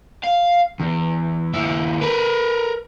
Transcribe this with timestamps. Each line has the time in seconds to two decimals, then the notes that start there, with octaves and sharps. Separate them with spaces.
0.23 F5
0.80 E2
1.54 D#2 E4
2.01 A#4 B4